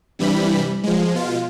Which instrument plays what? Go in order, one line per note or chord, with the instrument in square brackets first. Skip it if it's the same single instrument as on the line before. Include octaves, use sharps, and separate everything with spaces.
[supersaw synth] G2 C3 E3 G3 B5
F3 G#3
B2 F4